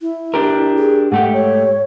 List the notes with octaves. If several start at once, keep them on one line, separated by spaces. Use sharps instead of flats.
E4
D4 G4 A#4
G#4
G#2 A3 G4 F#5
C#5